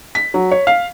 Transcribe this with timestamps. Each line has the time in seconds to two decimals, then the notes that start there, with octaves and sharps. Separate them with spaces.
0.15 B6
0.34 F#3
0.51 C#5
0.67 F5